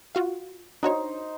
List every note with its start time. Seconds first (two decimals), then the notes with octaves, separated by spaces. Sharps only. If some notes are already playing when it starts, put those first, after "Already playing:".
0.15 F4 F#4 F5
0.83 D4 D#4 F#4 C5 C#5